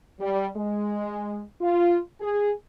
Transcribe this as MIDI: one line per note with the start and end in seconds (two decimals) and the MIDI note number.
0.20 0.48 55
0.57 1.40 56
1.61 1.98 65
2.20 2.52 68